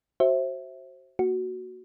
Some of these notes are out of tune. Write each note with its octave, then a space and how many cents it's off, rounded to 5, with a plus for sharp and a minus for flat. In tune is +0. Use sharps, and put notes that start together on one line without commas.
F#4 +20 C5 +20 E5 -5
A#3 +0 F#4 +0